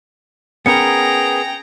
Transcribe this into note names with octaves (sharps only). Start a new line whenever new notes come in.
B3 C#4 G#4 A#4 G5 A#5 C#7